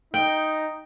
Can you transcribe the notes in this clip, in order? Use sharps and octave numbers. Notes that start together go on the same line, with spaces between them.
D#4 G5